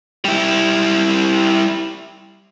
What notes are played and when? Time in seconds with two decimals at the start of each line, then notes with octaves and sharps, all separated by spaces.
0.25 G3 E4